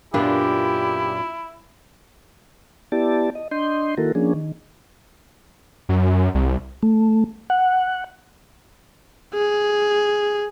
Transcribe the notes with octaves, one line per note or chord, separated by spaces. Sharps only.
F#2 A#2 B3 D4 E4 F4 G4
B3 E4 G4 D5 A5
D#5
D4 D#5 C6 G6
D#3 A#3 E4 F#4 A4 A#4
F3 A#3 C#4 D4 G#4
D#3
F#2
C2
A3
F#5
G#4